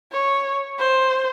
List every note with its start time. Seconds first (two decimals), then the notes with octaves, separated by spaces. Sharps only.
0.12 C#5
0.79 C5